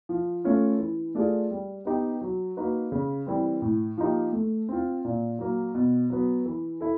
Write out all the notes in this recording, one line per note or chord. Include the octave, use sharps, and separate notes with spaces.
F3
A3 C#4 F4
E3
A3 D4 F4 G#4
G3
B3 D#4 G4
F#3
A#3 D#4 F#4 B4
C#3
E3 G3 C4
A2
F3 A#3 D#4 G4
A3
C4 F4
A#2
F#3 A#3
B2
F#3 B3
E3
E4 A4